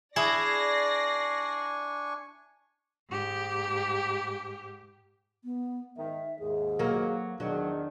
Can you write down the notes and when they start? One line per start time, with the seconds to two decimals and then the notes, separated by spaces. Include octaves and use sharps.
0.16 D4 E4 G#4 D5 G#5 C#6 A#6 C7
3.09 G#2 G4
5.44 B3
5.97 G#2 D#3 E5
6.40 D#2 G#2 G#4
6.79 F#3 A#3
7.40 E2 D#3 F#3 D4 G#4